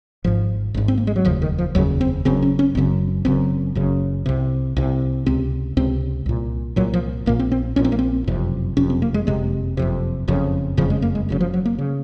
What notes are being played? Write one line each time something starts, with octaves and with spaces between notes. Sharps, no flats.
G#1 G#2 F3
G#1 G#2
C4
A#3
G#3
F#3
F1 D#2 C#3 F3
D#3
F3
F1 D#2 C#3 F#3
C4
F#1 F#2 C#3 C4
C#4
C#4
F#1 F#2 C#3 C4
F#1 F#2 C#3 C4
F#1 F#2 C#3
C2 C3
C2 C3
C#2 C3 C4
C#2 C3 C4
C2 A#2
C2 A#2 F#3
F3
A#1 A#2 A#3
C4
C4
A#1 A#2 C#4
C4
A#3
C4
F#1 F2 C3
F#1 F2 C3 C#4
C4
A#3
G#3
F#1 F2 C3 G#3
F#1 F2 C3
F#1 F2 C#3
F#1 F2 C#3 F3
G#3
A#3
G#3
F#1 F#2 C#3
F3
F#3
A#3
C#3